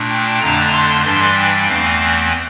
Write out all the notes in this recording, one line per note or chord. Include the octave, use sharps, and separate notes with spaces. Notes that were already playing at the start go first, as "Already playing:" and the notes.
Already playing: A#2 A3 D4
G5
F2 D3 A3 D4 A#5
C6
G2 E3 G3 D4 C6
G5
E2 E3 A3 C4 F5
G5